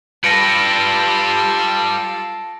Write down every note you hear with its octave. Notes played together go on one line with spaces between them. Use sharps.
G3 F4 A4 B4 A#6 C#7 D7